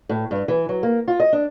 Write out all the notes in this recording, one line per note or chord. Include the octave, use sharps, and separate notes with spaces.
A2
G2
E3
F#3
A#3
F4
D#5
D4